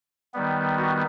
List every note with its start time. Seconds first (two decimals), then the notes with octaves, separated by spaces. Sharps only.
0.34 D#3 G3 B3
0.78 F#4